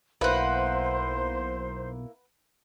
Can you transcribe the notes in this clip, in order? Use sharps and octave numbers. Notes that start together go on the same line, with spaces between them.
B1 A#3 E4 B4 C5 F#5